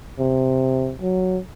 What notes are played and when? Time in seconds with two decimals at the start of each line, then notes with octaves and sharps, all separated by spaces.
0.19 C3
1.02 F#3